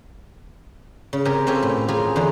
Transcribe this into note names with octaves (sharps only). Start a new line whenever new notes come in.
C#3
C3 G4 A#4 G5 G#5
C4 C#4 F4 G4 A4 C#5
A2
F4 G4 G#4 A#4
E2 D3 C5 C#5 A#5